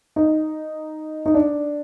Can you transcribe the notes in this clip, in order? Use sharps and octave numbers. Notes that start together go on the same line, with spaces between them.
D#4
D#4
D4